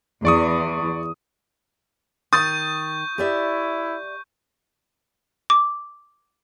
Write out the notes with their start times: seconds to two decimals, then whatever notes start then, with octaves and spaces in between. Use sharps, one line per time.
0.25 E2 D5 C#6 D#6
2.33 D#3 C#6 D#6 G6 A6
3.18 E4 G4 D5 E5
5.50 D6